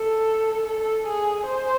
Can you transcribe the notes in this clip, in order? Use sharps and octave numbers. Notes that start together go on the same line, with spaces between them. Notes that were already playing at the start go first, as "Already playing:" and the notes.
Already playing: A4
A4
G#4
C5